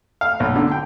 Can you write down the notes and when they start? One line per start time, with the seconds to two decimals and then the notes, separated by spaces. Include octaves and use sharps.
0.21 F5
0.40 B1
0.56 D3
0.71 G5